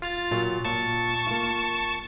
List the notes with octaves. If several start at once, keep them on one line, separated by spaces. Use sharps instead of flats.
F4 F6 A6
A#2 F#3 A#3
A#2 A5 C#6
A#3 F4